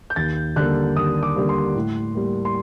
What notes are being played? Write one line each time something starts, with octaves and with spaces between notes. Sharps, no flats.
G6
D#2 A6
D3 G3 A#3 F#6
D#2 D#6
D6
D3 G3 A#3
C6
A2
G3 A#3
C6